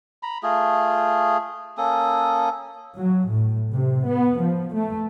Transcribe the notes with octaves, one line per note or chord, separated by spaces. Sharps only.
A#5 B5
A3 F4 G#4
A#3 C#4 A4 D#6
F#3
A2
C3
B3
F3
A3